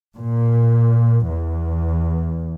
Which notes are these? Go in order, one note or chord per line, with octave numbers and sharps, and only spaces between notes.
A#2
E2